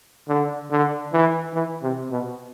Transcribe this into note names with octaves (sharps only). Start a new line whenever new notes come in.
D3
D3
E3
E3
C3
B2